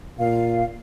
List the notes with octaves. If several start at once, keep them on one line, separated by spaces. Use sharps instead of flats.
A#2 F5